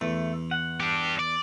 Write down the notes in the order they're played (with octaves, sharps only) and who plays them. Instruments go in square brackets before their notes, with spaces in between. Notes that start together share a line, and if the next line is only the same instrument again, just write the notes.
[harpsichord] E2 [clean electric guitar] A3
[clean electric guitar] F#5
[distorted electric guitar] D4 G4
D5